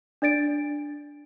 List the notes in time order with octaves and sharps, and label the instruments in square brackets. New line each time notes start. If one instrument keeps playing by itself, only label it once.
[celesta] D4 D5 A6 D7